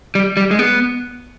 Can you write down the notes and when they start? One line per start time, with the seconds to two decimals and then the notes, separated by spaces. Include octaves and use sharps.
0.15 G3
0.37 G3
0.51 G#3
0.59 B3